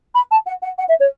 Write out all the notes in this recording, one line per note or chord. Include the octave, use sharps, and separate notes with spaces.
B5
A5
F#5
F#5
F#5
E5
C#5